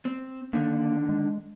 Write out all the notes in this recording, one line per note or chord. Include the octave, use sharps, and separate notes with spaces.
C4
D3 D#3 A#3 D4
G#3